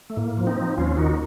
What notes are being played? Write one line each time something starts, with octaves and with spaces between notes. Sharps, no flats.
A3
A2 A#3
F3
C4 D#4
F3
D#2 C#4 F4
D#3 D#4 F#4